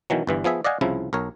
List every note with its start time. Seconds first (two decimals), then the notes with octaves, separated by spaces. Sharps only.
0.10 B2 D#3 E3 F#3
0.27 G1 G2 E3
0.44 F3 B3 G#4 E5
0.64 D5 D#5 F5 F#5 G#5
0.81 C2 C#3 F3 E4
1.13 B1 A#4 C#5